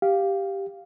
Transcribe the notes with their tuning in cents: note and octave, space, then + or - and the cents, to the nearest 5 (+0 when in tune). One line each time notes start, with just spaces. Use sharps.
G4 +0 F5 +0